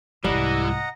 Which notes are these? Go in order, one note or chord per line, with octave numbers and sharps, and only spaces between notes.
C2 G#2 E3 G3 D#5 F#5 A#5